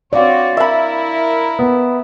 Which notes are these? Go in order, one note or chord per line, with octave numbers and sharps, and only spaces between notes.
C4 F#4 C#5 D5 F5
E4 A#4 E5 B5
B3